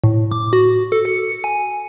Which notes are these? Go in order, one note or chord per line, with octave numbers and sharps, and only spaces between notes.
A2
D6
F#4
A4
C#7
G#5